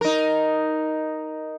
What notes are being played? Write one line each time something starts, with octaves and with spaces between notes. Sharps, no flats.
D#4 A#4